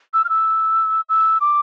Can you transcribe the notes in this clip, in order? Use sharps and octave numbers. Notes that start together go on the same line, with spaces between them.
E6
F6
E6
E6
D6